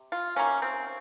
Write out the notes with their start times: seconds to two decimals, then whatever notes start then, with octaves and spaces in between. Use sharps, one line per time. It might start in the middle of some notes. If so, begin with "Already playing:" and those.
Already playing: C3
0.12 F4
0.36 C3 D#3 A#3 C#4
0.62 C4